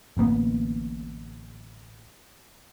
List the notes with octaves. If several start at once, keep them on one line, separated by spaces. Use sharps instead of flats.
D1 A1 A#3 B3